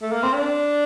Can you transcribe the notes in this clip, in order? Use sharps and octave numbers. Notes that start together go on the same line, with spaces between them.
A3
A#3
C4
D4